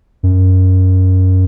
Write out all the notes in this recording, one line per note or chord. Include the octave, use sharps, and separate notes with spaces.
F#2